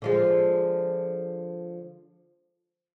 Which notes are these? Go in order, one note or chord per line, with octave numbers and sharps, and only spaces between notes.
D3 F3 G#3